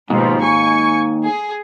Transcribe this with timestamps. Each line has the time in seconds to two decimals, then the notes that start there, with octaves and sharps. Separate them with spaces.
0.10 D#2 G#2 B2 F3
0.42 G#5 C#6
1.24 G#4